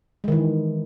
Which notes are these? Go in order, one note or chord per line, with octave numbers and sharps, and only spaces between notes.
D#3 E3 G#3